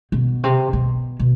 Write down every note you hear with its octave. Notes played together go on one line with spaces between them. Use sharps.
B2
C3
B2
B2